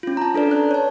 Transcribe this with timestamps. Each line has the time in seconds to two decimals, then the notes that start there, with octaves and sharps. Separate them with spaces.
0.03 C#4 F4
0.17 A5 A#5
0.34 D4 A4 B4 D5
0.51 F#6
0.71 C#5 A5